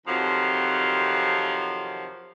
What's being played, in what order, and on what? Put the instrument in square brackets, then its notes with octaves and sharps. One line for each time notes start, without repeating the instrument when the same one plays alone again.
[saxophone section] F2 C3 D#3 F3 F#3